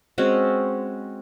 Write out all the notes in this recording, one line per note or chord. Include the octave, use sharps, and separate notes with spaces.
G#3 C4 C#4 F#4